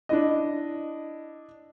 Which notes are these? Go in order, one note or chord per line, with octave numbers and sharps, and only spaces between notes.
D4 E4 D#5